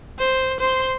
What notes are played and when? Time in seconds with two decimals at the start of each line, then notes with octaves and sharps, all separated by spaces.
0.19 C5
0.60 C5 C6